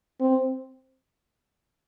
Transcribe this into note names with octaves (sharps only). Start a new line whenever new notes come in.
C4